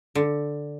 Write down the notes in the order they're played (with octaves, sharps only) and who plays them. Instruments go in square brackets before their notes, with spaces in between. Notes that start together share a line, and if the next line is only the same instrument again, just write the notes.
[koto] D3